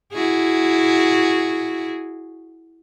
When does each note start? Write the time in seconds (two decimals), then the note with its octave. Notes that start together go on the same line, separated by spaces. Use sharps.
0.13 E4 F#4 G#4